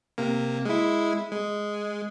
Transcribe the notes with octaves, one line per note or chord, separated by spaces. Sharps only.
C3 A#3
G#3 E4
G#3